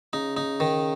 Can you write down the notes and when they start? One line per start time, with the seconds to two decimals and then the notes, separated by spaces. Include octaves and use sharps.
0.13 C#3 D#4
0.37 D#4
0.60 D#3